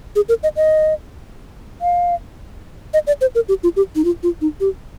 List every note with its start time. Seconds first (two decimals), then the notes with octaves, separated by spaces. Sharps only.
0.16 G#4
0.29 A#4
0.43 D#5
0.56 D#5
1.82 F5
2.94 D#5
3.07 D5
3.21 C5
3.35 A#4
3.49 G4
3.63 F4
3.76 G4
3.96 D#4
4.05 F4
4.23 F4
4.41 D#4
4.60 G4